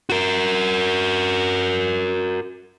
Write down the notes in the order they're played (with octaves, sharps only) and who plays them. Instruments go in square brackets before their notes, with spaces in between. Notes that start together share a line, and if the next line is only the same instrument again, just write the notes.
[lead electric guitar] F#4 A#4